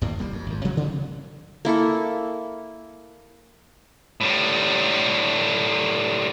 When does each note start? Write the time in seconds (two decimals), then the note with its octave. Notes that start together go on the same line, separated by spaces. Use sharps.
0.01 E2 A2 D#3 A#3
0.19 F1 G3 A#3
0.32 F2
0.46 G#1 F2
0.64 C3 F3 F#3 A3
0.76 A1 G2 C3
1.65 A#3 E4 A4 C#6
4.21 A2 G3